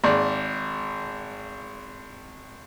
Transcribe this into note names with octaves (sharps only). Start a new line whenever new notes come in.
G#1 D5